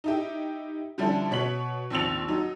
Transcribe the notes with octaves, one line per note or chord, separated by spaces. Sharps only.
D#4 E4 G4
D3 F3 G3 C#4 D4 E4
B2 C#5 B6 F#7
A#1 D#2 C4 E6 A6 F7
F#3 D#4